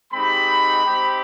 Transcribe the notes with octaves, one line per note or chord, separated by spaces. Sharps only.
G#3 C4 D#4 G4 B5
C4 D#4 G4